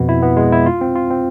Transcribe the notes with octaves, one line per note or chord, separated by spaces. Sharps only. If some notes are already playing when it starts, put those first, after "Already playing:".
Already playing: F2 B2 B3
E4
B3
G#3
E4
F4
C4
F4
C4